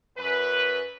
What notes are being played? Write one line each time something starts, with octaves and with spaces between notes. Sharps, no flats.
F#2 B4